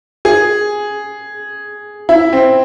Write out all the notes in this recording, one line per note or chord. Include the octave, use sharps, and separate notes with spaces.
G#4
E4
C4